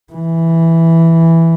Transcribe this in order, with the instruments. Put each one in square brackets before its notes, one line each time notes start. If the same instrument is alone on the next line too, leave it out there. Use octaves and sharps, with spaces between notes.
[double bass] E3